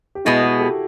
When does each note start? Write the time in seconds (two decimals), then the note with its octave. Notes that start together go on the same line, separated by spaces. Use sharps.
0.15 G4
0.25 B2 G#3 B3 E4 F#4
0.42 F#4 G#4
0.60 G4 A4